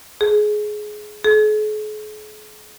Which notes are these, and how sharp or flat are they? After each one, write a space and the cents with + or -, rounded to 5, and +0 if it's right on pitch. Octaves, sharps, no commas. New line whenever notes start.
G#4 +20
G#4 +45